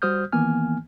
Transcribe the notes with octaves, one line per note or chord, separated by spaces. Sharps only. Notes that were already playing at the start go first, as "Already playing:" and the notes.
G3 F#4 C5 D#6 F6 G6
D#3 E3 A#3 B3 G#5 F6